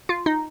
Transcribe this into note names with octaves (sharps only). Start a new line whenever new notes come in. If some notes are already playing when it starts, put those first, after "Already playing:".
F4
D#4